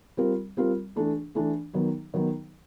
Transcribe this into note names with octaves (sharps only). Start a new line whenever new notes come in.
G3 C4 F4 A#4
G3 C4 F4 A#4
E3 A3 D4
E3 A3 D4
D#3 F#3 B3
D#3 F#3 B3